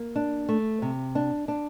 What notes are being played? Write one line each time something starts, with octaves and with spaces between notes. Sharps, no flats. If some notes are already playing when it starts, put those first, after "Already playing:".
Already playing: A#3
D4
A3
C3
D4
D4